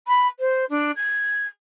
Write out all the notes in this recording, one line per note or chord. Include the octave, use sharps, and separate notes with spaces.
B5
C5
D4
G#6